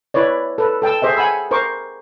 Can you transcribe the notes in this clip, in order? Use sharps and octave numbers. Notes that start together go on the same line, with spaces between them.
E4 B4 C#5 D5
A4 B4
A4 G5 A5 E6
G#4 C5 D#5 E5
F#5 G#5 B5 E6
A#4 C5 C#6 D6